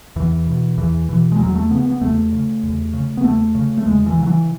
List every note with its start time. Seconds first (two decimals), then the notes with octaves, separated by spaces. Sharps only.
0.16 E2 E3
0.46 B2
0.78 E2 E3
1.09 B2 E3
1.32 G#3
1.39 E2 F#3
1.55 A3
1.70 C#3 B3
1.86 B3
2.01 E2 A3
2.32 C#3
2.63 E2
2.93 C#3
3.17 B3
3.24 E2 A3
3.55 C#3
3.78 A3
3.86 E2 G#3
4.06 E3
4.16 C#3
4.23 F#3
4.27 E3